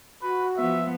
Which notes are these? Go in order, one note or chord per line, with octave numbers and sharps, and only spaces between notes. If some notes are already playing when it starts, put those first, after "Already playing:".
F#4 B4
F3 B3 E5